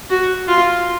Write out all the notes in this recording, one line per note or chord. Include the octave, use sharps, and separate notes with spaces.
F#4
F4